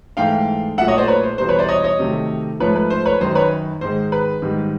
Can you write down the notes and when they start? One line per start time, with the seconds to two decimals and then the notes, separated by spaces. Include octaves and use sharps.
0.17 G#2 E3 A3 F5 G5
0.78 A#2 F#3 A3 E5 F#5
0.88 C#5 D#5
0.98 C5 D5
1.08 B4 C#5
1.23 C5
1.38 E2 B2 G3 C5
1.49 B4 C#5
1.59 C5 D5
1.69 C#5 D#5
1.84 C#5 D#5
1.99 C3 D#3 F#3 A3
2.60 G#2 F3 A3 B4 C#5
2.76 B4
2.90 C5
3.06 B4 C#5
3.21 F#2 D#3 F#3 C5
3.35 B4 C#5
3.81 G#2 D#3 G#3 C5
4.12 B4
4.42 G#2 D#3 G3